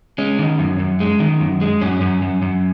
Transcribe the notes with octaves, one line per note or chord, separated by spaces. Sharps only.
G#3 C#4
D#3
F#2
F#2
G#3
D#3
F#2
G#3
F#2 C#4
F#2
F#2
F#2